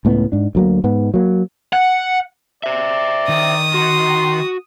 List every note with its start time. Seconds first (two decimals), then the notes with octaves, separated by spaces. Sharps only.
0.05 C#2 A2 B3
0.32 G#2 D4
0.55 D2 F#3 A#3
0.84 G#2 B3
1.14 F#3 A#3
1.73 F#5
2.64 C5 D5 E5
3.29 D#3 D#6
3.74 F#4 C6